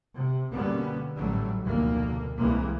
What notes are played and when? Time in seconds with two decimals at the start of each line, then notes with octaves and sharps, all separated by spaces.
0.17 C3
0.51 B2 D3 G3 A#3 B3 C#4
1.16 A1 G#2 F#3 G3 A3
1.62 F1 D2 B2 A#3
2.37 C2 C3 E3 G#3 A#3